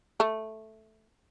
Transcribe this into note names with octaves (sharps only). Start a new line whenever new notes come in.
A3